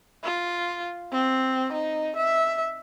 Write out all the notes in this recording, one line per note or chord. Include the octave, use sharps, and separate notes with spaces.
F4
C4
D#4
E5